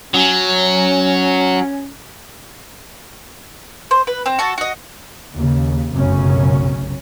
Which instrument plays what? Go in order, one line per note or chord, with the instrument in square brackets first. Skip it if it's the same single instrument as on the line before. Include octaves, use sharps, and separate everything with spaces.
[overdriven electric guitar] F#3 [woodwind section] C#4
[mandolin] C5
B4
C4
F#4 A4 A5
F#4 D#5
[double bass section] D#2 C#3
F1 B1 F#2 C#3 C#4